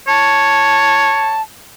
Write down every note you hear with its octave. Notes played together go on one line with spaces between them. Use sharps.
C#5 A5